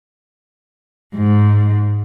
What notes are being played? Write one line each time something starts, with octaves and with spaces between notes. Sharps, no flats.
G#2